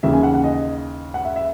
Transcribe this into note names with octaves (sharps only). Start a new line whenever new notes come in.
D#2 C#3 E3 E5
G#5
F#5
F#5
D#5
F#5
E5
E5